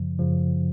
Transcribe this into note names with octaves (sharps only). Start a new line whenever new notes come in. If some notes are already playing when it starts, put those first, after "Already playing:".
Already playing: F#2 C#3 F3
F#2 C#3 F3